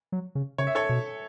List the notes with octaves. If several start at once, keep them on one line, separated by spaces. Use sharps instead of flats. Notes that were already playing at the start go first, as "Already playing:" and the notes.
F#3
C#3
C#3 C#5
E5
A4 C#5
B2